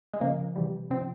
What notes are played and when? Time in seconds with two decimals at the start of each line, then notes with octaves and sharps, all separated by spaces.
0.13 G#3
0.20 C#3 F3 A#3
0.56 C3 E3 G3
0.90 C3 C4
0.94 F3